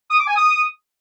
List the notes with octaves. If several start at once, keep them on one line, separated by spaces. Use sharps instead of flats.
D#6
D6
G#5
D#6